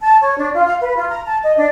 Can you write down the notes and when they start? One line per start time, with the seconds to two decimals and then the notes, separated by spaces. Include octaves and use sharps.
0.03 A5
0.22 C#5
0.38 D4
0.54 F4
0.66 F5
0.81 B4
0.97 F4
1.09 A#5
1.26 A5
1.43 D#5
1.57 D4